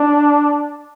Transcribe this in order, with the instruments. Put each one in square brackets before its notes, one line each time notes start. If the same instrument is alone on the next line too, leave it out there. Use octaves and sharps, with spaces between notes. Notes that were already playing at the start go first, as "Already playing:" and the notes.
Already playing: [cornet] D4